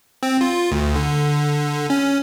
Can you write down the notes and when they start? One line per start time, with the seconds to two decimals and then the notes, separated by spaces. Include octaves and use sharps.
0.23 C4
0.41 F4
0.72 D2
0.95 D3
1.90 C#4